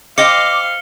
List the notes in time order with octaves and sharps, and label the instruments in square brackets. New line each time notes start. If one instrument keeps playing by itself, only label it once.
[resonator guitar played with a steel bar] C5 D#5 G5 [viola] F5 [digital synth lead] D6 [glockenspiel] C#7 G7